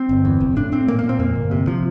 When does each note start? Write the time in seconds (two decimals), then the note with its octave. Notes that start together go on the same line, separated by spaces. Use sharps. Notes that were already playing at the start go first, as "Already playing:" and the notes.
Already playing: C4
0.09 G1
0.25 E2
0.40 F1
0.56 A2 D4
0.72 A2 C4
0.88 A#2 A#3
0.99 A#2 A#3
1.09 C4
1.19 F2 A#3
1.35 G1
1.51 C3
1.67 C3 F3